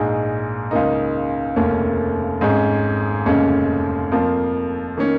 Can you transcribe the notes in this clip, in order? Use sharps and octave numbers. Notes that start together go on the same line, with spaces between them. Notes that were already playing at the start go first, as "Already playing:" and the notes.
Already playing: A#1 G#2 G#3 D#4
C#2 C#3 A#3 D#4
F1 D#2 C#3 A#3 C#4
G#1 G#2 G#3 C#4
F1 D#2 C#3 G#3 C#4
F2 F3 A#3
D#3 A#3 C#4